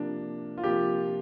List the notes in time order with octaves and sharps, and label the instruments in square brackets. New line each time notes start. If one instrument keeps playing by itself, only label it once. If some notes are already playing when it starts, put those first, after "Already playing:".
Already playing: [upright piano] C3 F3 A#3 [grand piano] D4
[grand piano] F4
[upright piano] C3 F3 A#3 [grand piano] G4